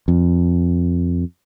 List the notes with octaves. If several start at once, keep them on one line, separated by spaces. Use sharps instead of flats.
F2